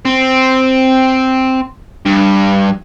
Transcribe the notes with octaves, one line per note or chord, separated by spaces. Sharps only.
C4
G2